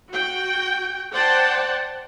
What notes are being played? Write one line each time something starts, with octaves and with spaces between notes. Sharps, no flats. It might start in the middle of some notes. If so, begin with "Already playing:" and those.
F#4 G5
C5 D5 F#5 G5 A5